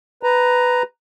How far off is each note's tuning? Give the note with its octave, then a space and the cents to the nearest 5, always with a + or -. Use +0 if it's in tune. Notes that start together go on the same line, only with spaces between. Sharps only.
B4 +10 A#5 +0